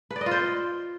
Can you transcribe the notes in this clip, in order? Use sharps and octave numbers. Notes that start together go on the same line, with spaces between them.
B4
D5
D#5
F4
C5